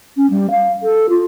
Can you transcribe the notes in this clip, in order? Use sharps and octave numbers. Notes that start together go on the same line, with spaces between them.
C#4
G3
F5
A4
F4